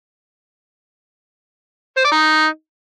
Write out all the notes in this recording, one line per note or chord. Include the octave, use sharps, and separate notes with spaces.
C5
D5
D#4